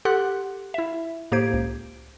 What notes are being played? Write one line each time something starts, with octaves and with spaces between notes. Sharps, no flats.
G4 A4 F#5 C6 F#6
E4 E5
A2 A#3 G4 C5 G#6 D7
C#2